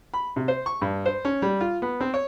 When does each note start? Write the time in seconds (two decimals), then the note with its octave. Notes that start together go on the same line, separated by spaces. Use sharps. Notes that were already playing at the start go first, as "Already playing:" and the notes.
0.14 B5
0.36 C3
0.48 C5
0.66 C#6
0.82 G2
1.06 C5
1.25 C#4
1.42 G3
1.61 F4
1.82 B3
2.01 C4
2.14 C#5